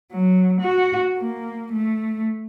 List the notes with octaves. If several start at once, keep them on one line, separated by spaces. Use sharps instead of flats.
F#3
F#4
A#3
A3